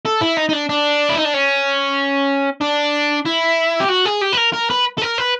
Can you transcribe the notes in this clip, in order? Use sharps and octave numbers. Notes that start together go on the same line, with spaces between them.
A4
E4
D#4
D#4
D4
D4
E4
D#4
D4
C#4
D4
E4
G4
F#4
G#4
G4
B4
A#4
A#4
B4
A4
A#4
B4